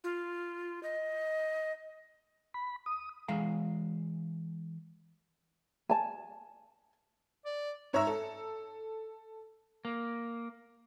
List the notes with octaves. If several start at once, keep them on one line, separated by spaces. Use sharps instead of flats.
F4
D#5
B5
D#6
E3 G#3 F5 A#5
G#5 A5
D5
G#2 C#5 E5 A#5 E6
A4
A#3